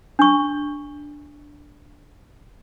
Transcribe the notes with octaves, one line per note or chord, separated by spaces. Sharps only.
D4 C#6